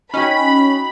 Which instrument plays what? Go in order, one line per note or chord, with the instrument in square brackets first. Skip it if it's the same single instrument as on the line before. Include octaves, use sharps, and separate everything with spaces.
[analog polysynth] C#4 [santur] D#4 F#4 G5 [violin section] B5